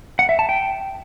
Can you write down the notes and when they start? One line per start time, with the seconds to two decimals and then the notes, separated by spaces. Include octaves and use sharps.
0.19 F#5
0.29 E5
0.39 A5
0.49 G5